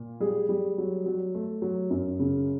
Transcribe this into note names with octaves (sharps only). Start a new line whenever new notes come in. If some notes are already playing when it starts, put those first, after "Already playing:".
Already playing: A#2
G3 G#4
G3
F#3
F#3
A3
F#3
F#2
C#3